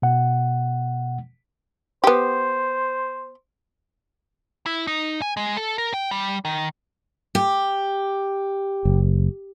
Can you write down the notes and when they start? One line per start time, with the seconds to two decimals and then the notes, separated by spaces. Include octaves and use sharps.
0.02 B2 F#5
2.04 B3 G4 C5
4.66 E4
4.87 D#4
5.22 G#5
5.37 G#3
5.57 A4
5.78 A#4
5.94 G5
6.11 G3
6.45 D#3
7.35 G4
8.85 F#1